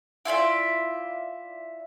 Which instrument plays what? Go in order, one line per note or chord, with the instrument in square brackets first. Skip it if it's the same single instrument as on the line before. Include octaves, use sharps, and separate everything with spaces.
[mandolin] E4 F4 D5 E5